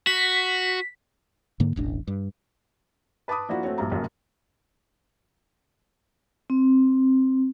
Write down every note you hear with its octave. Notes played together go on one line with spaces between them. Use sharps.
F#4 B6
G#2 D3 A#3
E1 A1 D4
G2
B4 A5 B5 D6 D#6
F3 A#3 D4 E4 F#4
A3 C4 F#4 C#5
A#1 G2 A#5
F1 B1 F#2 C#3 F#3 A#3
C4